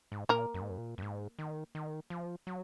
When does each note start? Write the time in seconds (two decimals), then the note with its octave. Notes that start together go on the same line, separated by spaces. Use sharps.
0.12 G#2
0.29 A#2 A#3 A#4
0.54 F#2
0.61 G#2
0.70 F#2
0.78 A#2
0.98 F#2
1.02 G#2
1.39 D#3
1.75 D#3
2.10 F3
2.47 F#3